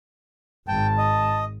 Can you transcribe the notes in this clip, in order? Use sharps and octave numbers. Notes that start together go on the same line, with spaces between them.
G#1 G5 A5
D#5